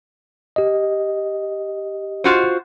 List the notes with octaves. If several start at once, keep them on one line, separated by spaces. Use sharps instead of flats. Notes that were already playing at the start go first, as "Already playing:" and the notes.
G4 D#5
F4 F#4 C5